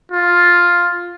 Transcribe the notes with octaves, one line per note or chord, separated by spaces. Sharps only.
F4